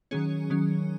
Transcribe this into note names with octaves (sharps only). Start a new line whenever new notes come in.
D#3 F#3 C#4 G#4 C#5
D#3 F#3 C#4